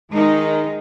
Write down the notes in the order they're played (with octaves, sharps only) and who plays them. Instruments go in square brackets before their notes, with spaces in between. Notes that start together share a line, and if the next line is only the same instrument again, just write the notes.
[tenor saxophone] D#3 [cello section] G#3 D#4